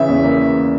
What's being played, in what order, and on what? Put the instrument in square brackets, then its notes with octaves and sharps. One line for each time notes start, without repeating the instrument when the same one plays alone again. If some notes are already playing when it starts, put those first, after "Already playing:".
Already playing: [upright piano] C#3 E3 [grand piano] E5
[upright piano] E2
A#3